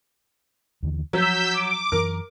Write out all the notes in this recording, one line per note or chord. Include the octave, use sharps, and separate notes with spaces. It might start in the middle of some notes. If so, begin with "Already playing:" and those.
D#2 D3 E3
F3 F#3 E6 G6 B6
D6
F#2 E3 A#4